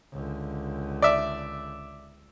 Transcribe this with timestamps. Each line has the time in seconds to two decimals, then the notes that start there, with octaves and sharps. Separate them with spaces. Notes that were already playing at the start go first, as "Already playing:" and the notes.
0.13 C#2 D3
1.02 D5 E5